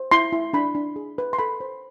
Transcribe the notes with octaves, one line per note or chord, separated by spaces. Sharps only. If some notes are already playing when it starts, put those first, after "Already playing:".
Already playing: C5
E4 C6
E4
D4 B5
D4
G#4
B4
C6
A4 B5
C5